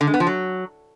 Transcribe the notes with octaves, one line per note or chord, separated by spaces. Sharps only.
D3
G#3
B3
F3
F#3